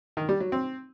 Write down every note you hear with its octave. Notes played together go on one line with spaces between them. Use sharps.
D#3
G3
F#3
C4